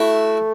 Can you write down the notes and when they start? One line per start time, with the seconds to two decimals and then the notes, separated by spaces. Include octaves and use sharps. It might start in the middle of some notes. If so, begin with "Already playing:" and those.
Already playing: A3 E4 F#4